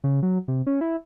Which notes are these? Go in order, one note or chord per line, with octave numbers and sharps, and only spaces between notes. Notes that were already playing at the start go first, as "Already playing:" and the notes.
C#3
F#3
C3
C#4
E4